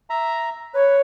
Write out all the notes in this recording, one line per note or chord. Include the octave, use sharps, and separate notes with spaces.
E5 A#5
B4 C#5